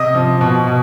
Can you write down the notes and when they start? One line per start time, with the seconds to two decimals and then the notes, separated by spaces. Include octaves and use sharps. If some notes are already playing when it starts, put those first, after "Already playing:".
Already playing: C3 D#5 D#6
0.15 F3
0.41 B2
0.67 B2